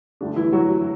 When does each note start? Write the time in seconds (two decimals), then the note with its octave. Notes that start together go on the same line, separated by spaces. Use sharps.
0.21 D2 D3 A3 D4
0.36 E3 E4
0.53 F#3 F#4